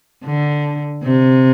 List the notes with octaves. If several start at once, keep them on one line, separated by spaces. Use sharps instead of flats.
D3
C3